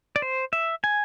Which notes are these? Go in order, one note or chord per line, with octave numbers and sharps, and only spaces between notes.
D5
C5
E5
G#5